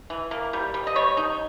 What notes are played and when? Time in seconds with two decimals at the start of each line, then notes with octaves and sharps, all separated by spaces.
0.10 E3
0.31 A#3
0.53 G3
0.74 G3
0.87 D#5
0.95 G3 C#5
1.17 D#4